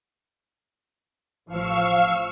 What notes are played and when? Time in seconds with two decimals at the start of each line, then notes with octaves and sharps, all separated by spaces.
1.48 A1 F3 F5 C#6 E6